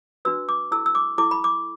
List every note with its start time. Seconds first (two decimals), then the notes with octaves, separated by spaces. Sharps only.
0.25 D4 F#4 B4 E6
0.49 D6
0.71 E4 A4 E6
0.86 E6
0.95 D6
1.18 E4 A4 D6
1.31 B5
1.44 D6